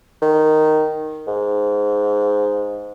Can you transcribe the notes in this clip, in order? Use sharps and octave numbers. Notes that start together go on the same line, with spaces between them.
D#3
G#2